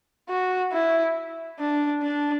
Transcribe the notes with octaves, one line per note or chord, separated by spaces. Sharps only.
F#4
E4
D4
D4